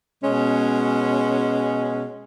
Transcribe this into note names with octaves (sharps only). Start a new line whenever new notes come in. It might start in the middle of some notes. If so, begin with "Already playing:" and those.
B2 G#3 C#4